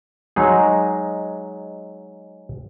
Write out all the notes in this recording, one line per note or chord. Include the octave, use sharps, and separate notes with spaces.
F#3 G#3 D#4 G#4